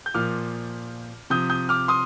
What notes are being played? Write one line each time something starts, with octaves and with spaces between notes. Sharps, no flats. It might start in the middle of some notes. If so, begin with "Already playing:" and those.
G6
A#2 F3 D6 F6
C3 F3 D#6 G6
D#6 G6
D6 F6
C6 D#6